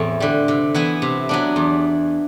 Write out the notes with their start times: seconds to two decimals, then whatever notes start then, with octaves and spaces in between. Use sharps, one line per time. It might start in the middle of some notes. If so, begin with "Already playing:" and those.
Already playing: E2 A2 C4 E4
0.20 D3 G3
0.48 C3
0.74 E3 B3 E4
1.02 C3
1.29 F#3 B3 D4
1.56 E2